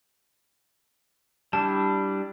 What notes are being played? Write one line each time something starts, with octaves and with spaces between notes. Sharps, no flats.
G3 D4 E4 A5